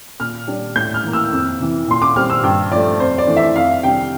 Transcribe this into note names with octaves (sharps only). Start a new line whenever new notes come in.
A#2 F6
G3 D4
A2 G6
F6
E3 A#3
E6
F2
C3 E3
A#2 C6
D6
G3 C4 F6
E6
G2 G5
F3 A3 D5
F2 C5
D5
E3 A3 D4
E5
F2 F5
C3 G3 D4 G5